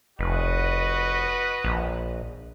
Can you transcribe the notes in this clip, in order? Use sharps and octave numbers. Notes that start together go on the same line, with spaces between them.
F1 F#4 B4 D#5
A#1